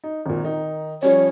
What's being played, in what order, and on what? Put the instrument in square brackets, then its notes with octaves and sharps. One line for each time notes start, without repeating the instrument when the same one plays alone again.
[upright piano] D#4
G#1 A#2
D#3 D#4
[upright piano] F3 G3 C#4 [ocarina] C#5